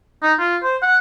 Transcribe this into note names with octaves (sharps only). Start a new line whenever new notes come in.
D#4
F4
C5
F#5